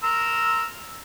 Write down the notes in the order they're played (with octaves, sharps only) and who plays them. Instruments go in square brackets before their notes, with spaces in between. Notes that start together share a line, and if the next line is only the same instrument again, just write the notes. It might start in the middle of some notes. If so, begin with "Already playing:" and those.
[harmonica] A#4 C6 E6